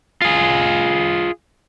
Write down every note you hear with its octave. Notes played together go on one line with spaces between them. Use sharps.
F4 G#4